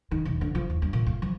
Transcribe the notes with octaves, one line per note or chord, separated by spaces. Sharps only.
D#3
E1
D3
F3
D#2
G2
A#2
F4
F3